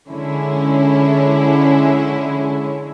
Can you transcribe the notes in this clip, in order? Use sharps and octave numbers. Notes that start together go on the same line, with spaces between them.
D3 G#3 C#4 E4